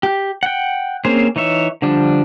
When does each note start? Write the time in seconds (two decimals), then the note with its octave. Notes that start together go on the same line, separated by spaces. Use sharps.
0.03 G4
0.43 F#5 G5
1.05 A#3 C4 C#4 G#4 C5
1.36 E3 D#4 C#5 E5
1.82 D3 F3 G3 D4